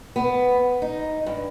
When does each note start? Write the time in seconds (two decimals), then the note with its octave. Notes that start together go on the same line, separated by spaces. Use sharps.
0.16 B3
0.82 D#4
1.26 G2